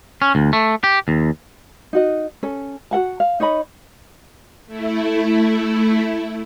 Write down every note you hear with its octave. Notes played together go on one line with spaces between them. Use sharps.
C#4
D2
A3
G4
D#2
D#4 F#4 D#5
C#4 A4
F#4 A#4 F#5 A5
F5
D#4 C#5 D#5 B5
A3 E4